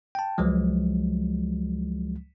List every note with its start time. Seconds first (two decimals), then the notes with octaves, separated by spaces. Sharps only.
0.15 G5 A5
0.38 C#2 F3 F#3 G#3